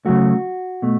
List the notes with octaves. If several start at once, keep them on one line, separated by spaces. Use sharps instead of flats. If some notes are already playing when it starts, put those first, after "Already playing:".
C#3 F#3 A3 F#4
B2 A3